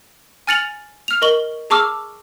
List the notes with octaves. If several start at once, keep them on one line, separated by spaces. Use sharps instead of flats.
G#5 F6 A6 C#7 F7 F#7
F6 F7
A#4 D#5 C#6 F#7 G7
G#4 A5 C#6 D6 E6 F6